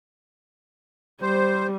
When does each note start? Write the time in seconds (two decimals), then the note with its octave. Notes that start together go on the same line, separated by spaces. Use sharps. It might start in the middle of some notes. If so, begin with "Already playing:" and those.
1.22 G3 C5